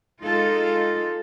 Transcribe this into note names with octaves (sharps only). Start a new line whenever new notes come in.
G#3 D#4 F4 A4